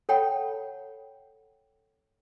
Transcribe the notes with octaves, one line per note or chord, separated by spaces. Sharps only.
A4 C#5 F#5 G5 A5 B5